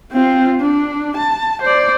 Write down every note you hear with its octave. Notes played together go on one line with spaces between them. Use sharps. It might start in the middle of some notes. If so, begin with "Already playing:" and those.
C4 F4
D4
A5
C5 D5